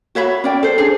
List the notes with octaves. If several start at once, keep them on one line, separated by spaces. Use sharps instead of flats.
F#4 C#5 E5 B5
C#4 D5 G5
A4 C5
D4 G#4